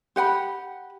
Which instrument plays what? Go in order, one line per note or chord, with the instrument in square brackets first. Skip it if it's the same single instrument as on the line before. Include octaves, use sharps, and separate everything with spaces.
[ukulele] G4 F#5 G5 B5